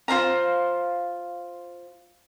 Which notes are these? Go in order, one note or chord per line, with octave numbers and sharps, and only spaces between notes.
F4 C5 F5 A#5